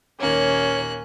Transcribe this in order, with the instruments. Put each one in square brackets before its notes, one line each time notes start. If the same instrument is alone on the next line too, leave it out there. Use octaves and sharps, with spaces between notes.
[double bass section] D#2 A#2 D#3 [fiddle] A#3 F#6 [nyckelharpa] C#4 [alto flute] C#5